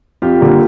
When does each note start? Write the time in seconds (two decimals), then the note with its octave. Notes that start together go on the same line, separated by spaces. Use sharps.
0.22 F2 F4 G4
0.41 D3 G3 A#3